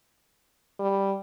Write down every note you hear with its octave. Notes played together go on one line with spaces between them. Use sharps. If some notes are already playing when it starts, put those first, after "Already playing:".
G3